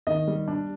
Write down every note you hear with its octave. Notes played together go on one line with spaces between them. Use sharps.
D#3 D#5
G3
D4